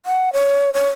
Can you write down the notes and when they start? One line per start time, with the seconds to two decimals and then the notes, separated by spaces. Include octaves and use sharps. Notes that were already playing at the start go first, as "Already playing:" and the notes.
0.06 F#5
0.33 C#5
0.74 C#5